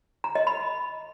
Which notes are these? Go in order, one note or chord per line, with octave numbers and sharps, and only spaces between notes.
A#5
D#5
B5